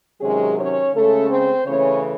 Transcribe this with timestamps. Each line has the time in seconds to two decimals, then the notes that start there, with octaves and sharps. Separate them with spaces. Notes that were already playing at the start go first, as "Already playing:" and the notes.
0.21 C3 D#3 F#3 G#3 C#4 G#4
0.57 C#4 C#5
0.93 C#3 G#3 A3 C#4 A4
1.30 C4 C5
1.66 C#3 E3 A3 C#4 C#5